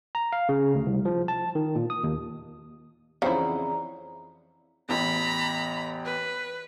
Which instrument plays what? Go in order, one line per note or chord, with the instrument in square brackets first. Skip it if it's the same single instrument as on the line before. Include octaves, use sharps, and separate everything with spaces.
[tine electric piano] A#5
F5
C#3
D2
C2
F3
A5
D#3
A#2
D#6
D#2
[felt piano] F2 E3 [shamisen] C#3 [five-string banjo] E4 C5 F#5 [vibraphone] D5 A#5
[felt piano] A1 E2 [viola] A#5 B5
[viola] B4